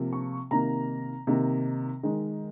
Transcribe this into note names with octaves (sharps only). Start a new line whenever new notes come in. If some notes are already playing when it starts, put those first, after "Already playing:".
Already playing: C3 F3 A#3
C#6
C3 D#3 A#3 A#5
C3 D#3 A#3
D#3 G#3